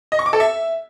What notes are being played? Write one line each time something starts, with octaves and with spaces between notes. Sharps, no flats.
D#5
C#6
D6
A4
E5